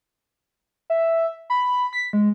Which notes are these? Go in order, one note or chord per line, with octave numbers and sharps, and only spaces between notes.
E5
B5
B6
G#3